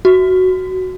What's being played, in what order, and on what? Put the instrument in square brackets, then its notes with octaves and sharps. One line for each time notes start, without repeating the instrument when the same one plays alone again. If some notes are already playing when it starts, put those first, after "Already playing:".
[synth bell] F#4